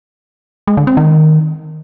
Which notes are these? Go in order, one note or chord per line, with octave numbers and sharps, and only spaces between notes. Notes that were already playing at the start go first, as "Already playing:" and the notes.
G#3
D3
C4
D#3